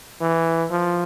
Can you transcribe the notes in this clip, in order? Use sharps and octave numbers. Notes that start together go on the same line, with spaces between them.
E3
F3